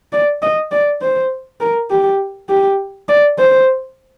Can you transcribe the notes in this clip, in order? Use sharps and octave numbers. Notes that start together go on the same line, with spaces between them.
D5
D#5
D5
C5
A#4
G4
G4
D5
C5